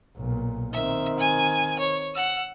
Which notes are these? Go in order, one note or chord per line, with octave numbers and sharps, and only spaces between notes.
B1 A#2
D#3 C4 E5
G#5
C#5
F#5 E6